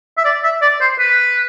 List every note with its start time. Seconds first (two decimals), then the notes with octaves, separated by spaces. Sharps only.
0.17 E5
0.25 D5
0.44 E5
0.62 D5
0.81 C5
0.99 B4